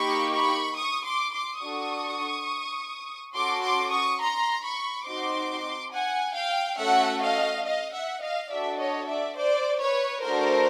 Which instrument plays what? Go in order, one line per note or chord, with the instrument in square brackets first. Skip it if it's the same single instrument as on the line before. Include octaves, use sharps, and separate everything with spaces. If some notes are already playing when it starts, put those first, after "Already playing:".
Already playing: [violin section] A#3 D#4 G4 B5 C#6
B5 C#6
C#6 D#6
C6 D6
C6 D6
D4 F#4 A4 C#6 D#6
C#4 F#4 A4 C6 D6
C6 D6
C#6 D#6
A#5 C6
B5 C#6
C4 D#4 F#4 C6 D6
F#5 G#5
F5 G5
A3 C#4 F#4 A4 E5 F#5
D#5 F5
D#5 F5
E5 F#5
D#5 F5
D4 F#4 A4 D5 E5
C#5 D#5
D5 E5
C5 D5
B4 C#5
A3 D4 F#4 A4 A#4 C5